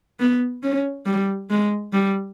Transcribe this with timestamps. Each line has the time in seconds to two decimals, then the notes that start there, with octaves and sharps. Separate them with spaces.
0.20 B3
0.63 C#4
1.06 G3
1.50 G#3
1.93 G3